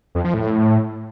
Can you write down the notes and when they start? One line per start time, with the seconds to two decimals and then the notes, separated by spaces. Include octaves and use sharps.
0.15 F2
0.24 F3
0.34 A2